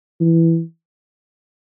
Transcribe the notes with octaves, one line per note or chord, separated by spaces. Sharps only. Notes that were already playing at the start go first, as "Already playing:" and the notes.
E3